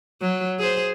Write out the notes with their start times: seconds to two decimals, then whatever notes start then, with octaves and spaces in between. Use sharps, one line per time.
0.22 F#3
0.59 G#4 C5